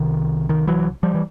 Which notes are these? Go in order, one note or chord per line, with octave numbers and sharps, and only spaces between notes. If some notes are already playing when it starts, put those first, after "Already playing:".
Already playing: C2 C3 D#3
D#3
E3 F#3
F3 G3
E3